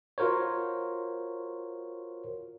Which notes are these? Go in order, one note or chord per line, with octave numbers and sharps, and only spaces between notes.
F4 F#4 A#4 C5 C#5